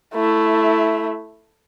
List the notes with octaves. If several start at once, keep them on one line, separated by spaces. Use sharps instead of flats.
A3 E4